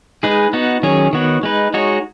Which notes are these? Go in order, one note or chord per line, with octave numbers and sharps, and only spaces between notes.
G#3 D#4 G#4 B4
B3 D#4 F#4
D#3 F#3 C#4 G#4 C#5
D#3 B3 F#4 C#5
G#3 D#4 B4
G#3 D#4 F#4 C#5